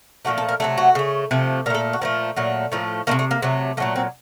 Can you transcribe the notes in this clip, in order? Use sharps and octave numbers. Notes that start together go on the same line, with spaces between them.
A#2 F3 A3 F#4
A4
A#4
C3 F#3 A3 A4
F#4
C#3 A3
C3 F3 A3
A#2 A3 A4 A#4
F#4
A#2 F3 A3 C4
A#2 F#3 A3
A2 F3 A3 A#3
C3 D#3 A3 A#3
A3
A#3
C3 F#3 A3
A#2 F#3 A3 A#3
C4